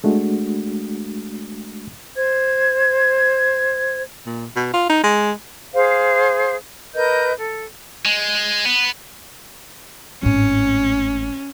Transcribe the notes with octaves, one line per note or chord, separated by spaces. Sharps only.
G#3 A3 D4 F#4
C5 G#6
A#2
B2
F4
D#4
G#3
G#4 C5 F5
A#4 B4 D#5 G6
A4
G#3
B3
G#1 A2 C#4